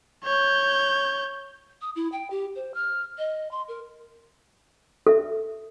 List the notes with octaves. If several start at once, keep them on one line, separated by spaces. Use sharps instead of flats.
C#5 G6
D#6
E4
G5
G4
C5
F6
D#5
C6
A#4
A4 E5